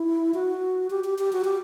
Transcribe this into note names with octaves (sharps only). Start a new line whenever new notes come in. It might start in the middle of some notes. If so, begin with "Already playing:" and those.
Already playing: E4
F#4
G4
G4
G4
F#4
G4